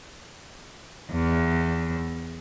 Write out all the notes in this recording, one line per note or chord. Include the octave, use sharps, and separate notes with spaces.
E2